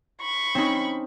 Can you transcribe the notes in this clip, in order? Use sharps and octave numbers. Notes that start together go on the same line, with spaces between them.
B5 C#6
C4 C#4 D#4